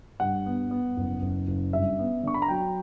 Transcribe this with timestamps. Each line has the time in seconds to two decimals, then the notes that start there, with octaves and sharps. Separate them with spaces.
0.20 G2 F#5
0.46 B3
0.71 B3
0.97 F#1
1.22 F#1
1.48 F#1
1.73 G2 E5
1.99 B3
2.23 D3 C#6
2.34 B5
2.42 A#5
2.48 F#3 G5